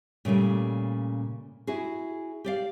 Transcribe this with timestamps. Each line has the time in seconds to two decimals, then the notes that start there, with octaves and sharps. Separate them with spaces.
0.25 A#2 C#3 G3 A3
1.67 E4 F#4 G#4
2.44 G4 D5 F5